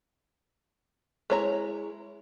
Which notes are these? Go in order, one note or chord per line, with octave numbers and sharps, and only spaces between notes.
G#3 E4 C#5 A#5